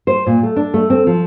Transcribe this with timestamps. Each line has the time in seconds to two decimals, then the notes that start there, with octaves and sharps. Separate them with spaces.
0.07 C5
0.26 A#2
0.43 A3
0.56 D4
0.74 A3
0.90 C4
1.07 F3